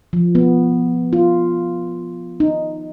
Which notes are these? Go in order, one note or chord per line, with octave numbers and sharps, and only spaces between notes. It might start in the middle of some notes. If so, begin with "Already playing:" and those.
F3
B3
F4
D#4